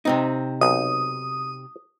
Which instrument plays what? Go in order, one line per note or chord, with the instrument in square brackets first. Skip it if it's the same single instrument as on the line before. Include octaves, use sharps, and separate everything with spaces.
[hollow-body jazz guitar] C3 C4 D#4
[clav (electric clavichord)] B1 [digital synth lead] D#6